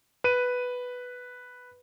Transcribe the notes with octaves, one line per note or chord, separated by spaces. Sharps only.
B4 D#7